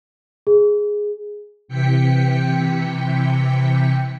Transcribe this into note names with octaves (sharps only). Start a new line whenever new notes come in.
G#4
C3 E3 G5 B6 C#7